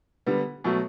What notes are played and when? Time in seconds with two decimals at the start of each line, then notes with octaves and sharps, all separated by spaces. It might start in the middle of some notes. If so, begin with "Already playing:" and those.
0.27 D3 G3 B3
0.64 B2 F#3 A3